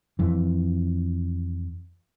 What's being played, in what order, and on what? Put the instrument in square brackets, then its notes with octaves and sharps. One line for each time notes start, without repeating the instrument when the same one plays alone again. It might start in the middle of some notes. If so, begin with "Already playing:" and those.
[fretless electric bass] F2 E3